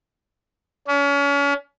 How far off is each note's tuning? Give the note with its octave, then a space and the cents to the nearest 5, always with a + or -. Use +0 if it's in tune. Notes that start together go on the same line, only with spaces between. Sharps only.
C#4 +35